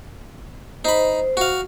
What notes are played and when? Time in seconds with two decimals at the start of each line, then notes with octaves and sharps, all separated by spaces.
0.85 D#4 C5 B5
1.37 F#4 F5